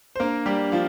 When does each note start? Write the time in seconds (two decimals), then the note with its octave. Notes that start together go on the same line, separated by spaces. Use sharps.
0.16 C5
0.20 A#3 D4 A#4
0.46 G3 G4
0.72 F3 F4